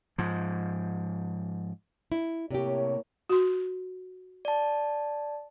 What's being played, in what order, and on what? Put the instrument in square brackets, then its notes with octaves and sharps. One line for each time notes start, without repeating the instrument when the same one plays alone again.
[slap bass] G#2 F3
[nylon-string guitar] E4
[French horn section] A2 A#3 C#5 [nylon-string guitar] C3 G4
[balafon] F#4 C6
[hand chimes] D5 A5